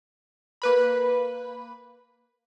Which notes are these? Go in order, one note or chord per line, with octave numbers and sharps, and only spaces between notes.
A#3 B4 B5